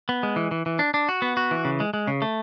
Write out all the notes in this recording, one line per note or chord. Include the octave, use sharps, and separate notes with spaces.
B3
G#3
E3
E3
E3
D4
D4
F#4
B3
F#4
E3
C#3
G#3
G#3
C#3
A3